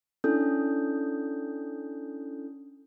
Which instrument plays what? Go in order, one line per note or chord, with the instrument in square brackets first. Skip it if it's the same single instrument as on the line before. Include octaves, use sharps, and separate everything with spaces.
[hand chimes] C#4 D4 E4 A4 D#6 G6